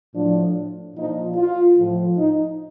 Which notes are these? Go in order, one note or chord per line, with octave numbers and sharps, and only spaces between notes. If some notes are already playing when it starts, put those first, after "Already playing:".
A2 F3 D4
A#2 F3 D#4
F4
A2 F3
D#4